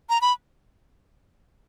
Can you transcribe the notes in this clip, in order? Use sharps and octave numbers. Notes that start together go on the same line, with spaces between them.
A#5
B5